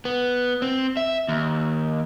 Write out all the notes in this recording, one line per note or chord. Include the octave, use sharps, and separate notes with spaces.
B3
C4
E5
D#2